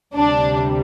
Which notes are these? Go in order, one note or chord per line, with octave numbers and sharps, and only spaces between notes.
D2 C3 G3 D4